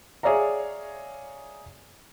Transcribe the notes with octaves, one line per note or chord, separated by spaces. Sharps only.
G#4 C#5 D5 E5 F5 A#5